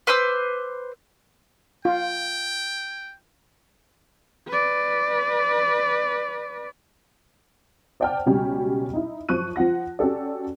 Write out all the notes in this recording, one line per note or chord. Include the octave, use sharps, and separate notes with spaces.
B4 C5 D6 E6
F4 G5
B4 D5
C5 D5 F#5 G5 A5 F6
C#2 B2 F#3 G3 C#4 G5
D#4 E4
F#2 F3 F4 C#6 F#6 D#7
F3 F4 F#5 A#6
C#4 F#4 G4 A4 D5